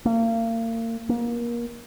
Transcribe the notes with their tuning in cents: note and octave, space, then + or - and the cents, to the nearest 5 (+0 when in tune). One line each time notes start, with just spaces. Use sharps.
A#3 -35
A#3 +25